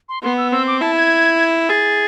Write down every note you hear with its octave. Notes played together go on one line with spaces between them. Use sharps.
C6
B3 C6
E6
C4 E6
D6
E4 A5
G#6
G#4 A6